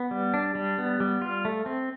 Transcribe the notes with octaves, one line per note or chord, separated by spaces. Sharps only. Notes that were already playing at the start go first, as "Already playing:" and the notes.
Already playing: B3
G3
D4
G3
B3
G3
F4
A3
C4